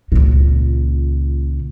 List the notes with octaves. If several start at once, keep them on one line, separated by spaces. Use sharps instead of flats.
C#2 A#2